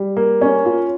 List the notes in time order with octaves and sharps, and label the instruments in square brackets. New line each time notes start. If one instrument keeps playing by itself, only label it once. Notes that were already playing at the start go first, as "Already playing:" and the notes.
Already playing: [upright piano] G3
A#3
C#4
F4